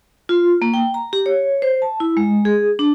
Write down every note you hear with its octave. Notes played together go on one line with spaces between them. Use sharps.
F4
A#3
G5
A#5
G4
C#5
C5
A5
E4
G#3
G#4
D4